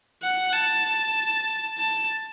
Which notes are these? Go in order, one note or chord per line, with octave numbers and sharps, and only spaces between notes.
F#5
A5
A5